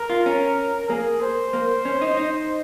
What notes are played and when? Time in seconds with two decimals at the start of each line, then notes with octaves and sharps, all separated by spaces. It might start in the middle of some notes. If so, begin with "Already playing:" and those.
Already playing: A#4
0.10 F4
0.26 C#4
0.89 A#3 G#4
1.21 C5
1.53 A#3
1.85 C#4
2.01 D#4
2.17 D#4